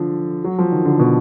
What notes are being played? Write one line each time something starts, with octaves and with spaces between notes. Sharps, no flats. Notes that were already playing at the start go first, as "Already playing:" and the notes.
Already playing: D3 F3
F#3
F3
D#3
D3
B2